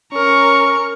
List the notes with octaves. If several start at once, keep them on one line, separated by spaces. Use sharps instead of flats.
C#4 A#4 C#6